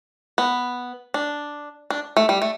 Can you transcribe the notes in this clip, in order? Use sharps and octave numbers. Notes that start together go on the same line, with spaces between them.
B3
D4
D4
A3
G3
A3